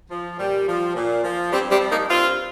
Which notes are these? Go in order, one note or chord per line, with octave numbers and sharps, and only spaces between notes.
F3
A#2 G3
F3
A#2
F3
G2 G3 C4
G3 C4
F3
A#3 D#4
G2 C4 F4